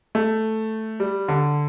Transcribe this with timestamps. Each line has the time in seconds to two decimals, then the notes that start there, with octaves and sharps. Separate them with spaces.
0.15 A3
1.00 G3
1.28 D3